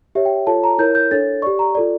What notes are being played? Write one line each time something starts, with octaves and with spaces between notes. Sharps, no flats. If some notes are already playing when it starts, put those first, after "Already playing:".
G4 C#5 E5
G5
F4 A4 C#5 A5
A#5
E4 A#4 C#5 G6
G6
D4 A4 C#5 A6
G4 D5 C#6
A#5
F4 A4 D5